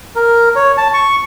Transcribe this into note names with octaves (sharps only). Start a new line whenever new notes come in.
A#4
C#5
A5
C#6